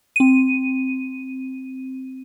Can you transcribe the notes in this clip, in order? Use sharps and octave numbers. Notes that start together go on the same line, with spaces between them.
C4 D#7